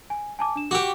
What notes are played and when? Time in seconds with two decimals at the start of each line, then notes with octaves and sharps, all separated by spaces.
0.10 G#5
0.39 G#5 A5 D6
0.56 D4 E7
0.71 F#4 G4 G5 D6